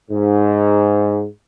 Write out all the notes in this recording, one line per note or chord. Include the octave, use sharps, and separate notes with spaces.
G#2